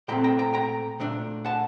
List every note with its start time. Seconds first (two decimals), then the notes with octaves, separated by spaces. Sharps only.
0.08 A#2 A3 C4 G5 A#5
0.24 G5 A#5
0.39 G5 A#5
0.54 G5 A#5
1.00 A#2 A3 D4
1.45 F#5 A5